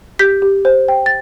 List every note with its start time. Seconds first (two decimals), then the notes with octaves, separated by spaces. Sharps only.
0.19 G4 G6 B6
0.42 G4
0.65 C5
0.88 G5
1.06 A6